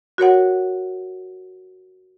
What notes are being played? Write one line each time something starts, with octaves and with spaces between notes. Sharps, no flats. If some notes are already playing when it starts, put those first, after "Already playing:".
F#4 A#4 C#5 F#5